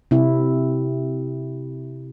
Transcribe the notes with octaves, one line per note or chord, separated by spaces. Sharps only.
C3 E4